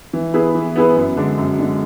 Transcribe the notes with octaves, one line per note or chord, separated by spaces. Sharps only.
E3
B3 E4 G#4 B4
E3
B3 E4 G#4 B4
F#2
D3 G#3 D4
F#2
D3 G#3 D4